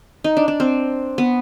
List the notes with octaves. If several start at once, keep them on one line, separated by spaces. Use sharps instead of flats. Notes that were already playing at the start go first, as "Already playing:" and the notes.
D#4
D4
D4
C4
B3